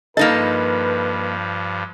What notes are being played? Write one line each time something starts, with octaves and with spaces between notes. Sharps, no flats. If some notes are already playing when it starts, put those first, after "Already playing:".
G2 F3 A#3 D#4 A4 B4 D#5